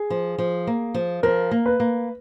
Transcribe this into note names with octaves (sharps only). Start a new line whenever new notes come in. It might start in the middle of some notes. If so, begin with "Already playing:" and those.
Already playing: G#4
F3
F3
A#3
F3
F3 A#4
A#3
B4
A#3